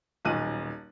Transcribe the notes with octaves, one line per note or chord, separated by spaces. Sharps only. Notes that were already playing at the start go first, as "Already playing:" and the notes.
D#1 B1 F#6 D#7